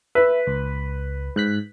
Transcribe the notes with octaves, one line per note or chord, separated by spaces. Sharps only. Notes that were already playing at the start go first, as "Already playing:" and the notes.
B4 E5
C#2
G#2 F#6 B6